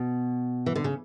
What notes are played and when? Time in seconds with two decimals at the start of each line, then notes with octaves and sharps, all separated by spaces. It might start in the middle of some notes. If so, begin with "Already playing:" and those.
Already playing: B2
0.66 E3
0.75 D3
0.84 C#3